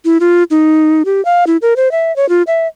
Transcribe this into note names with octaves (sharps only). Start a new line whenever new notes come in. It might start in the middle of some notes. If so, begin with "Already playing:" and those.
E4
F4
D#4
G4
F5
E4
A#4
C5
E5
C#5
F4
E5